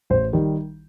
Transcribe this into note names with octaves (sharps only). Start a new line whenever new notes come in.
A1 C5
D#3 G3